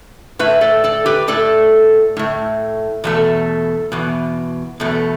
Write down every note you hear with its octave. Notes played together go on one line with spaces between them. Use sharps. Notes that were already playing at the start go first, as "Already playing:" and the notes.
A2 A3 B4 E5
A4 D5
A4 D5
G4 B4
A2 A3 A4 D5
A2 A3
E2 B2 A3
E2 B2
E2 B2 A3